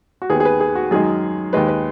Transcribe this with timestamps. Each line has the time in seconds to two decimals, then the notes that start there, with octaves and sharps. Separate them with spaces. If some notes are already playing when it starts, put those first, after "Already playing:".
0.22 F#4
0.30 D#2 D#3 B3 G#4
0.40 G#4
0.45 B4
0.60 G#4
0.75 F#4
0.91 F#2 D#3 G#3 G#4
1.53 D#2 D#3 G#3 B4
1.68 B4